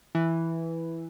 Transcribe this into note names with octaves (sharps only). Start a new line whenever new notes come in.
E3